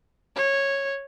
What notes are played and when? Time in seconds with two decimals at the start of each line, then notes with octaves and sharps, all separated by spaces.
0.36 C#5